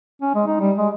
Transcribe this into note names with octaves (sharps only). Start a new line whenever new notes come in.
C#4
G#3
D#4
G3
G#3